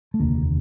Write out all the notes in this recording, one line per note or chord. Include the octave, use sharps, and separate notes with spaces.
A3
F1 D#2 D3 A#3